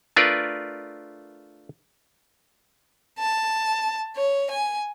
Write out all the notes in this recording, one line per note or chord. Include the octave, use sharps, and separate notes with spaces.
A3 D4 F4 A#4 B4 D5
A5
C#5
G#5